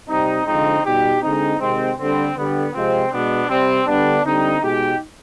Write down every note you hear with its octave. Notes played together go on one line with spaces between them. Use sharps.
C3 G3 C4 D#4
D3 F3 G#3 C4 D#4
B2 G3 D#4 G4
D3 G#3 C4 D#4
C3 D#3 G#3 C4
D3 G3 C4
D3 G3 B3
C3 F3 G#3 C4
B2 G#3 B3 D4
C3 G3 C4
D3 G3 B3 D4
D3 G3 C4 D#4
B2 G#3 D#4 G4